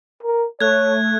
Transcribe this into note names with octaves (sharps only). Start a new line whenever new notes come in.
A#4
A3 C#5 F#6 G#6